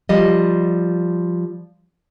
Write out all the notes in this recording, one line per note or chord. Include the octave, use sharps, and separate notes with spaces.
F3 G3 D#5